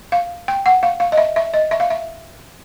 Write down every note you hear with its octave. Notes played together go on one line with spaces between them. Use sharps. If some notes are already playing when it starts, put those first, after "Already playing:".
F5
G5
F#5
F5
F5
D#5
E5
E5
D#5
E5
F5
E5